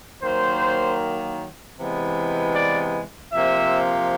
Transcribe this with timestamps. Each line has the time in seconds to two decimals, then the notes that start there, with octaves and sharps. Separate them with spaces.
0.22 D#3 F#3 A#3 C5
1.77 C3 E3 G#3 B3
2.55 D5
3.32 C3 F3 A#3 E5